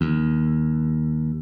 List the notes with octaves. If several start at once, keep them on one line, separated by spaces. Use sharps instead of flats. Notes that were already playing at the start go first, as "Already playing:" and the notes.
D#2